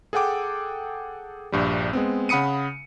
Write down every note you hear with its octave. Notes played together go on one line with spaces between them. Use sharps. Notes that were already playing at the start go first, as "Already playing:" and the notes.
G#4 A4 F#5 G5 D6
A#1 G2 G3
G#3 B3 C4
C#3 F#5 B5 D#6 C#7 D#7